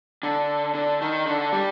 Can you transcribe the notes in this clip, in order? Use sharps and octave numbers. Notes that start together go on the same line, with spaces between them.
D3
D3
D#3
D3
G3